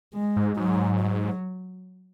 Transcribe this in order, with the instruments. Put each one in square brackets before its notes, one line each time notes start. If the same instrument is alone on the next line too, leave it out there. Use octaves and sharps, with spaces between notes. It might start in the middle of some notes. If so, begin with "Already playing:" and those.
[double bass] G#3
[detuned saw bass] G#2
[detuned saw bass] G#2 [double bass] F#3
[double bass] F#3